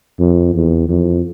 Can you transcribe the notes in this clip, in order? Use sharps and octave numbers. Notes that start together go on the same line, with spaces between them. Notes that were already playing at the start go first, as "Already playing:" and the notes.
F2
E2
F2